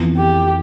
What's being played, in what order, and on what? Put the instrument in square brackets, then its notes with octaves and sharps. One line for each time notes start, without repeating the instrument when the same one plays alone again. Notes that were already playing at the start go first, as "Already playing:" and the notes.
Already playing: [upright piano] F2 E3 B3 E4
[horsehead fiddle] G4